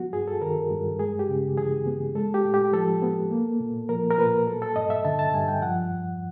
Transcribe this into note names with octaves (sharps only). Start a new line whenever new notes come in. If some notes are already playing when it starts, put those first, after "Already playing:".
Already playing: F#3 B3 F#4
G2 G#4
A4
D#3 A#4
G2
G#3 G#4
G4
C#3
E3 G#4
B3
G#3 A4
G4
A2
G4
F3 A4
B3
A#3
A#2
F3 A#4
A#4
A#2 B4
F#3 A4
A4
G2 D#5
E5
D3 A5
A5
G2 G#5
G5
F3 F#5
E2